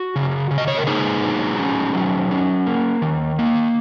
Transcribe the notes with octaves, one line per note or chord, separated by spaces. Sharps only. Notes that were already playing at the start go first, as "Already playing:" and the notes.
Already playing: F#4
C#3
C#3
D#5
C#5
A#4
A#3 D#4 G#4
F#3
C#4
F#3
C#4
A#3
D#3
A#3